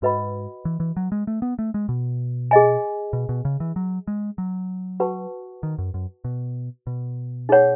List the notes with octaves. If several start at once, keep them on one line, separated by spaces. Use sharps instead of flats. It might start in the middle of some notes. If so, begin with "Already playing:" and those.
G#2 F#4 B4 D#5 F#5 B5
E3
E3
F#3
G#3
A3
B3
A3
G#3
B2
G#4 D#5 G#5
B2
B2
C#3
E3
F#3
G#3
F#3
F#4 B4 F#5 A5 C#6
D#3
F#2
F#2
B2
B2
D#4 G#4 C#5 F#5